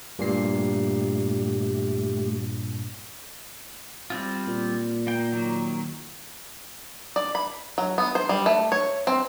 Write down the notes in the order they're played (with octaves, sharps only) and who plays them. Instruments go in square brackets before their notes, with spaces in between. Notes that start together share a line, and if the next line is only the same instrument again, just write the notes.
[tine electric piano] G2 A#2 C7 [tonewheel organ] A3 G4
[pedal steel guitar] G3 C4 F4
[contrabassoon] A#2
[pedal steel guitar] A#3 G5
D#3 F#3 A#3
[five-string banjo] D5
B5
F#3
B3
C5
G3
A3
C#5
C4